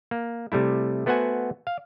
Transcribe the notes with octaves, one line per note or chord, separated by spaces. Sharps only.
A#3
C3 G3 A3 E4
A3 B3 F#4 C5 F#5 G#5
F5